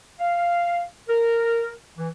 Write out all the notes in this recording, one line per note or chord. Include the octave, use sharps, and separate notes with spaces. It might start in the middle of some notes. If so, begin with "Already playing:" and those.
F5
A#4
E3